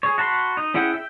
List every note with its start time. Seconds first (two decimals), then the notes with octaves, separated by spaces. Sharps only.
0.03 G#4 C#5
0.18 F#4 A5 B5 C6
0.57 D#4
0.74 C#4 E4 G#4 F#5 G5
0.94 E5 G5